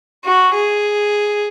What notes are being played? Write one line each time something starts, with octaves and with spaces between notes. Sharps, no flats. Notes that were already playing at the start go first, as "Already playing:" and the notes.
F#4
G#4